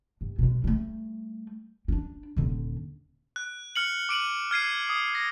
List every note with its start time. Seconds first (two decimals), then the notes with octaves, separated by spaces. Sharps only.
0.21 G2
0.39 B2 G#3
0.64 G3 A3
1.88 C#4 D4
2.36 D#1 D3
3.36 F#6
3.76 F6 C#7 F#7
4.09 D6 D7 D#7 F#7
4.51 F6 G#6 C7 D#7
4.89 D#6
5.15 A#6